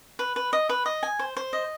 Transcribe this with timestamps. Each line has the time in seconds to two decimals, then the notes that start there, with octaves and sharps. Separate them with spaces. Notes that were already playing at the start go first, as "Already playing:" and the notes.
0.19 B4
0.36 B4
0.53 D#5
0.69 B4
0.86 D#5
1.03 G#5
1.19 C5
1.37 C5
1.53 D#5